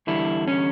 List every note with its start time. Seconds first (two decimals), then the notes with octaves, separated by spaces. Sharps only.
0.07 E2 D3 G3 E4
0.48 C#4